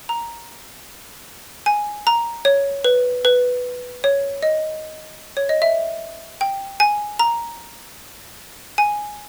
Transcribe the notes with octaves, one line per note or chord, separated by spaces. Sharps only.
A#5
G#5
A#5
C#5
B4
B4
C#5
D#5
C#5
D#5
E5
G5
G#5
A#5
G#5